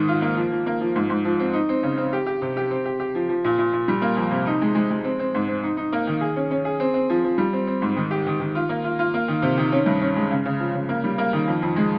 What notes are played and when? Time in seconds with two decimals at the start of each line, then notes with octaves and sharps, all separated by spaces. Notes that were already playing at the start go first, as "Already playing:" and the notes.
Already playing: G#2 D#3 D#4
0.08 F4
0.22 A#3
0.37 F3
0.52 F3
0.66 A#3
0.81 F3
0.95 G#2
1.10 G#2
1.25 F3
1.40 C4
1.53 D#4
1.69 C4
1.83 C#3
1.98 C4
2.13 G4
2.26 G4
2.42 C3
2.57 G4
2.71 C4
2.85 G4
3.00 G4
3.15 F3
3.29 F3
3.44 A#2
3.59 A#2
3.73 A#2
3.88 G3
4.02 A#3
4.17 F2
4.31 C3
4.46 D#4
4.61 G#3
4.75 G#3
4.90 G#3
5.04 C4
5.19 C4
5.34 G#2
5.48 C4
5.64 D#4
5.77 D#4
5.93 A#3
6.07 D#3
6.21 G#4
6.36 C#4
6.51 C#4
6.65 G#4
6.80 C4
6.94 C4
7.10 F3
7.24 F3
7.38 G3
7.53 C4
7.67 C4
7.82 G#2
7.96 D#3
8.11 G4
8.27 D#3
8.40 D#3
8.55 F4
8.69 A#3
8.84 F4
8.99 F4
9.14 A#3
9.28 D#3
9.42 C3
9.58 D#3
9.72 C#4
9.86 G2
10.01 C#4
10.16 G#3
10.31 C#3
10.45 C#3
10.60 F3
10.75 C#3
10.89 A#3
11.04 G3
11.18 A#3
11.33 D#3
11.48 F2
11.62 F2
11.76 G#3